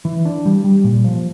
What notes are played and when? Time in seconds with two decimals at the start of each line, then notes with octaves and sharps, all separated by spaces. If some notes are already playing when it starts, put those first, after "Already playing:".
0.05 E3
0.25 D4
0.46 G3
0.64 G3
0.84 A#2
1.04 F3